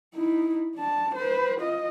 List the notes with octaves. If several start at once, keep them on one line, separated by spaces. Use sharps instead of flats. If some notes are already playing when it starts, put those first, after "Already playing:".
D#4 E4
D4 A5
B4 C5
F4 D#5